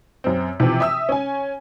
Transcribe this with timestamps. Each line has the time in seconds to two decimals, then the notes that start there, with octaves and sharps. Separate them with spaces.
0.24 F#2 C4
0.60 C3 E3 F3
0.80 E5 D#6 E6
1.09 C#4 G#5